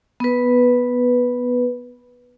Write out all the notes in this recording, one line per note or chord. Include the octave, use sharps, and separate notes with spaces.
B3 B4